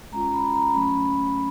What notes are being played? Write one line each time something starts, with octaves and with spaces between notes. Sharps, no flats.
G#3 C#4 F4 A#5
B5
A#5
F#3 A3 C#4 B5